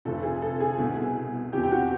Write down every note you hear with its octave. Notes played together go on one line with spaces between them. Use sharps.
F1 F2 C3 A4
G#4
A4
G#4
C2 B2
E2 C3 F3 G4
G4
F#4